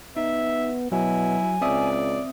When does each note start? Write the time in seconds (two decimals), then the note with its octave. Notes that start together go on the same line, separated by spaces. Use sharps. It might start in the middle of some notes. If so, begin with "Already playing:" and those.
0.17 B3 D#4 E5
0.92 B2 F#3 E4 G#5
1.62 C#2 C4 D5 E5 D#6